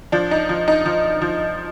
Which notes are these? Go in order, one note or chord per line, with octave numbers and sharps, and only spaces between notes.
F3 D4
D#4
F3
D#4
F3
F3